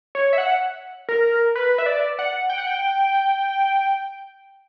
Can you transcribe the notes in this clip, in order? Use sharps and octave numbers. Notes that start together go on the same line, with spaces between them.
C#5
E5
F#5
A#4
B4
E5
D5
F#5
G5
F#5
G5